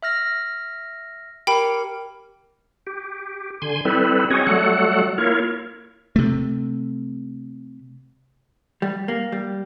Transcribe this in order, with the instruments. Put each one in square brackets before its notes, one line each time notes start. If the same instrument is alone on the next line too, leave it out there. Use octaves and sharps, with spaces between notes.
[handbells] E5 F6 A#6
[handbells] G4 A#4 [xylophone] G5 B5
[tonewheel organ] G4
D3 G#5 C6
G3 C4 E4 A4 B4
C4 C#4 F#4 G#4 C#5 D#5
F#3 G3 A3 F#4 A4 F#5
A#3 E4 F4 A#4 C#5
[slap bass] C3 A3
[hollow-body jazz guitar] G3
A#3
G3